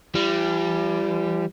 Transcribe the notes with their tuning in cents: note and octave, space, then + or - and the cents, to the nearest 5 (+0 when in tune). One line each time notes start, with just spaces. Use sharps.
E3 +45 G3 +0